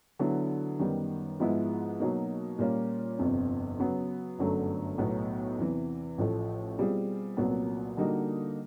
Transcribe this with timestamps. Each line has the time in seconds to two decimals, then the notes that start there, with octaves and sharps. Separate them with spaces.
0.19 D3 F#3 B3 E4
0.79 F#2 D#3 G3 B3
1.40 G#2 F3 G#3 B3 E4
2.00 B2 F#3 A#3 D#4
2.59 A#2 G3 A#3 C#4 F4
3.19 G1 F2 C3
3.78 C#3 F#3 B3
4.39 G1 F#2 D3 F#3 A3
4.98 B1 A2 F#3 B3
5.58 E2 C3 E3
6.18 A1 A2 F3 A3
6.78 B2 G3 C4 F4 G#4
7.37 C2 A#2 F#3 B3
7.97 D3 G3 A#3 D#4 F#4